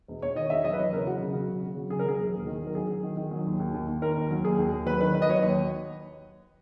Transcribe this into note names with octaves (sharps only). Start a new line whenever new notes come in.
E1
E1 C#5
D#3 D#5
E1 E5
F#3 D#5
B4
E2 C#5
C#3 A#4
F#3 F#4
C#3
F#3
C#3
C#3
F#3
C#3 G#4
A#4
F#3 G#4
E1
D#2
D#3
F#3
A#4
F#3 G#4
F#3
D#3
D#3
F#3
D#2
D#2
D#2
D#2
D#3 A#4
D#2
F#3
D#2 G#4
D#2
D#2
F#3 B4
D#3 B4
D#3 B4
D#5
F#3 C#5
D#2